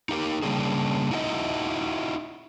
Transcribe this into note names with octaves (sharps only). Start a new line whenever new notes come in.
D#4 G4 A#4
C#3 G3 A#3 C#4 D4 G#4
D#4 E4 F#4 A#4 D#5